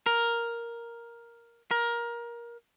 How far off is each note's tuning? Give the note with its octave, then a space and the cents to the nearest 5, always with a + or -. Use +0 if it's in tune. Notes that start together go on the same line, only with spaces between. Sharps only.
A#4 +5
A#4 +20